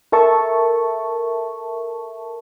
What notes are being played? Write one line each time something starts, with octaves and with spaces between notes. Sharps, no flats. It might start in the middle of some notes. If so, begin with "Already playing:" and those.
A4 A#4 E5 A5 C#6